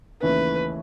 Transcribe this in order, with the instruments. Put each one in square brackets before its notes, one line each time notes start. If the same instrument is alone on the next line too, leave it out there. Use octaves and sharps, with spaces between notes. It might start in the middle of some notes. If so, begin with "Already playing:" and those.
[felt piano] D#2 C#3 E3 A3 [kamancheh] B4